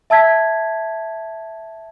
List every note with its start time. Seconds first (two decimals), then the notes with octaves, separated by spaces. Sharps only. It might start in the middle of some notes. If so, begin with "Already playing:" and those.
0.10 E5 A5 E6 G#6 B6